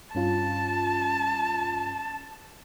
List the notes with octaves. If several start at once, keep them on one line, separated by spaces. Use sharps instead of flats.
G2 C#4 F4 A5